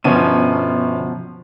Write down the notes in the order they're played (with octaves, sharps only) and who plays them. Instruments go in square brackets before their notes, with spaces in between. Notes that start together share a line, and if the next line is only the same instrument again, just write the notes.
[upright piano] G1 C#4 D#7 [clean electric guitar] B2 F3